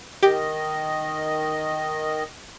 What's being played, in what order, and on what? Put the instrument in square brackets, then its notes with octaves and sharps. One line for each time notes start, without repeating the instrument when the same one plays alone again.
[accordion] D#3 D#5 [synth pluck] G4